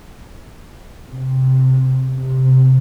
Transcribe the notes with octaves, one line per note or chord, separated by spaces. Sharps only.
C3
C3